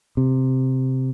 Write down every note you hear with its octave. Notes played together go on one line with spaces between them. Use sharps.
C3